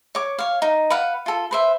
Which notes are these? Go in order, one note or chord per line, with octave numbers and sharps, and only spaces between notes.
C#5 D6
C#5 F5
D#4
B4 F5 F#5
F4 A4
B4 C5 E5